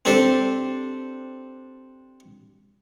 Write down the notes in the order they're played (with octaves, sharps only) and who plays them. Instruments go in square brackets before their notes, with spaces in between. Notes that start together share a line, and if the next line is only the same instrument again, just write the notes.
[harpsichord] C4 D4 G4 A4 C5